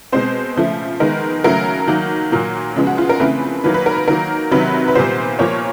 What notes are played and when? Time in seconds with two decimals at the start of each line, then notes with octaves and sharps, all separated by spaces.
0.12 B2 G#3 C4 C5
0.56 C#3 F3 A3
1.00 D#3 G#3 B3 A#4
1.44 C#3 F#3 A3 A#4
1.88 D#3 F#3 A#3
2.32 A#2 F#3 A#3
2.76 C#3 F3 G#3 B3
2.87 F#4
2.98 F4
3.09 A#4
3.20 C#3 E3 A3 C4 B4
3.64 D#3 F#3 A#3 B4
3.74 B4
3.86 A#4
3.97 B4
4.08 D#3 F#3 A#3 A#4
4.51 C3 D#3 F#3 B4
4.88 B4
4.95 A#2 G3 B3 C5
5.39 A#2 F3 A#3 C#5